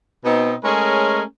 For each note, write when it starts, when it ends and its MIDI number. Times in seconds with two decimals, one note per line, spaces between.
0.25 0.54 47
0.25 0.54 59
0.25 0.54 60
0.25 0.54 63
0.64 1.23 56
0.64 1.23 57
0.64 1.23 61
0.64 1.23 68
0.64 1.23 70
0.64 1.23 73